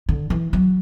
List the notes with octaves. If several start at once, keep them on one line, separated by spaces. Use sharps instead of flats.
D3
E3
F#3